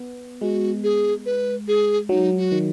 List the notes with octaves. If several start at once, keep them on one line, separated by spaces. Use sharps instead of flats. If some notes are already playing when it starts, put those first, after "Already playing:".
Already playing: B3
G#3 F#4
G#4
B4
G#4
F#3 D#4
F#4
D#3